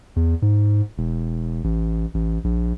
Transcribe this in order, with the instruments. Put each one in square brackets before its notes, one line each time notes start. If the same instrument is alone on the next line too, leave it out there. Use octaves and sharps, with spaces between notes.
[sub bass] E2
G#2
E1
A1
A1
A#1